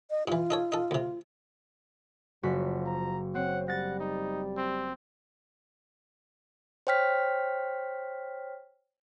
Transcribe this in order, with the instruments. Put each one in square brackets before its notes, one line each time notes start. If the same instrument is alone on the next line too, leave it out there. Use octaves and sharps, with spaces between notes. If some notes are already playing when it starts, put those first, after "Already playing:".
[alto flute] D#5
[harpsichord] G2 E3 [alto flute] F4
[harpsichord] D#4 A4 C#5
D#4 A4
D2 C3
[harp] F#1 F#4 B6 [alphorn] F3
[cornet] A#5
[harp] C4 [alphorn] C#5 [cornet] F#5
[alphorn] G3 [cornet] F#5 [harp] A6 A#6
[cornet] D#4
C4
[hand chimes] C5 C#5 G5 F6 B6